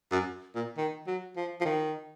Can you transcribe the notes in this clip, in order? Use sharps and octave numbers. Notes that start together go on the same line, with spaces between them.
F#2
A#2
D#3
F#3
F3
F3
D#3